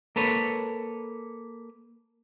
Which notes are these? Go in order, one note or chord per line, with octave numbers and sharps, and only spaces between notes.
A#3 A4 B4 C#5